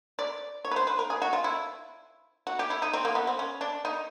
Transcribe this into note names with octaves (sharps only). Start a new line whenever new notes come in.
D5
C#5
B4
C5
B4
A#4
G#4
F#4
F4
E4
F#4
G4
E4
D#4
C4
A#3
B3
C4
C#4
D4
D#4